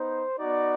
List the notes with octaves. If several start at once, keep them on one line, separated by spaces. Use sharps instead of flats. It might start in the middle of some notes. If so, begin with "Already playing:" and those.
Already playing: B3 D#4 C5
B3 D#4 F#4 D5